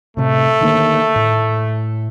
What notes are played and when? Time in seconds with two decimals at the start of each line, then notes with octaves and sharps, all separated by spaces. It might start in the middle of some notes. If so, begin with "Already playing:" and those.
0.17 A2 C3 A3
0.61 D3 D#3 A#3
1.16 A2